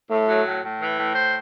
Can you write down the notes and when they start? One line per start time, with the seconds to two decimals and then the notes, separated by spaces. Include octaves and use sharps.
0.10 A2 A3
0.28 F#3
0.45 A2
0.63 A2
0.80 E3
0.98 A2
1.15 C5